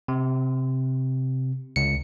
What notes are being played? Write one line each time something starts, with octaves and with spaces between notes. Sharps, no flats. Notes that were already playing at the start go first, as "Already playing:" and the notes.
C3
C#2 C#7